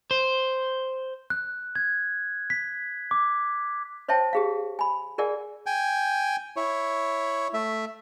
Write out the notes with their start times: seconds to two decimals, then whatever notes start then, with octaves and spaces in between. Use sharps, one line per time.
0.11 C5
1.30 F#6
1.76 G#6
2.50 B6
3.11 D6
4.08 C5 C#5 E5 G5 A5
4.33 G4 G#4 F5
4.79 G#5 B5
5.18 G#4 A#4 D5 F#5 G#5
5.66 G5 G#5
6.57 E4 C#5
7.54 A3 E5